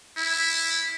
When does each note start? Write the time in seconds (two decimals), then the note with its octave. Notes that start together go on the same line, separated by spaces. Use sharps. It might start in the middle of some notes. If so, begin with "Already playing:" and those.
0.16 E4